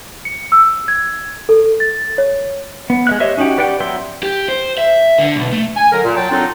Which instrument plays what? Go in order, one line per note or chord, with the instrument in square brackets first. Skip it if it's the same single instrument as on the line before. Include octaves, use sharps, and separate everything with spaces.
[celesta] C#7
E6
G#6
A4
A6
C#5
[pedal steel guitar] B3
G#3 E5 F#6
G4 C5 C#5 D#5 E5
C#4 D#4 F#4 G4 G5
G4 B4 D5 F#5 G5
F#3 B3 E5 G5 C6
[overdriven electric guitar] G4
C5
E5
D3
B1
A3
[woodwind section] G#5
F#2 D3 F#3 A#4
A#2
F#3 G5 A5
F#3 C4 D4 D#4 F4 A4